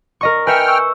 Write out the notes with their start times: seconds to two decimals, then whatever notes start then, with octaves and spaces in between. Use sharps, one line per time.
0.21 A#4 D#5 C#6
0.47 B4 E5 G5 G#5 F6 G6 C#7
0.68 C#6 E6